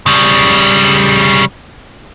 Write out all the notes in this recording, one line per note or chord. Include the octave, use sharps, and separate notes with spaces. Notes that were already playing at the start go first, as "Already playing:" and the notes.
C#3 G3